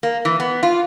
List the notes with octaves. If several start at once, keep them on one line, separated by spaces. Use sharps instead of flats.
A#3
E3
B3
F4